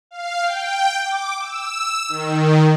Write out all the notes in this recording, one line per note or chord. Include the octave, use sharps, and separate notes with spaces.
F5
G5
D6
E6
D#3